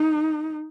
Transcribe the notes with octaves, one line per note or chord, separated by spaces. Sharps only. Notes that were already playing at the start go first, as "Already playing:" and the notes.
Already playing: D#4